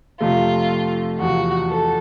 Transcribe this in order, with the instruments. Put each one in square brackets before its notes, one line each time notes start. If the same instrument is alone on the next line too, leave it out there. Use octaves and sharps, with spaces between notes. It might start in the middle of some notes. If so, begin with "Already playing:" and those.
[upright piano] F2 C3 F3 A3 [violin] F4
[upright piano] E2 C3 F3 [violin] F#4
[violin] A4